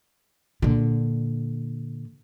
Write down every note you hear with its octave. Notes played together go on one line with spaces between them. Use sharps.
A#2 D3